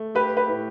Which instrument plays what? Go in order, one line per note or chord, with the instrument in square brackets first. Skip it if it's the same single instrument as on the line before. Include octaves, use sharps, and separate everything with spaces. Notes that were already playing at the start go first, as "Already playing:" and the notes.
Already playing: [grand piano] A3
[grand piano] G4 [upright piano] B4
[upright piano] B4
[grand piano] A2